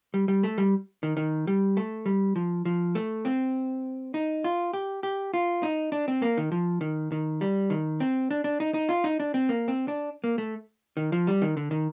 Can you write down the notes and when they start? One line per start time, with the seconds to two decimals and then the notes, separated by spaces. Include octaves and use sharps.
0.14 G3
0.28 G3
0.43 A3
0.58 G3
1.03 D#3
1.17 D#3
1.47 G3
1.77 A3
2.06 G3
2.36 F3
2.65 F3
2.95 A3
3.25 C4
4.14 D#4
4.44 F4
4.73 G4
5.03 G4
5.34 F4
5.63 D#4
5.92 D4
6.08 C4
6.22 A#3
6.37 D#3
6.52 F3
6.81 D#3
7.12 D#3
7.41 G3
7.70 D#3
8.00 C4
8.31 D4
8.44 D4
8.60 D#4
8.74 D#4
8.89 F4
9.04 D#4
9.20 D4
9.34 C4
9.49 A#3
9.68 C4
9.88 D4
10.24 A#3
10.38 A3
10.97 D#3
11.12 F3
11.27 G3
11.42 D#3
11.57 D3
11.71 D#3